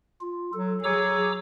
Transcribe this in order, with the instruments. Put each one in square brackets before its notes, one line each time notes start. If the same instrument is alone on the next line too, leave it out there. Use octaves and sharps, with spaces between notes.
[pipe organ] F4
[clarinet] F#3 [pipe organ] A4
[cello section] F#3 G#4 [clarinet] C#5 [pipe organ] A#5 D6 E6